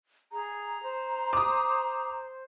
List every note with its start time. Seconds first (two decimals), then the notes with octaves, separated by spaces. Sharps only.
0.32 G#4 A#5
0.83 C5
1.33 D6 D#6